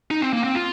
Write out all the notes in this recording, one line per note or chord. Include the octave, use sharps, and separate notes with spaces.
D#4
C4
A#3
C4
F4